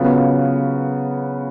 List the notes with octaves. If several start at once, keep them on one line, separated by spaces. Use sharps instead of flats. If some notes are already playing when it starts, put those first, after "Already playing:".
Already playing: C#3 F#3 B3 F4